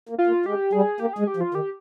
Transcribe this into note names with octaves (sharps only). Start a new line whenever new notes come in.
A#3
F4
A#3
G#3 G4
G3 G#4
A#3 G4
G#4
G#3
G4
F3
F4
D#3 G4